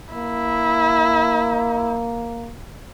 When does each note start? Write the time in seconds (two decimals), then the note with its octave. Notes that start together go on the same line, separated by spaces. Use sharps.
0.14 A#3 E4